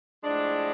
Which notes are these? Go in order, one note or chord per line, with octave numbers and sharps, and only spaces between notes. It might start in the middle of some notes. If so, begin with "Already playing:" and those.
A2 F3 G#3 D4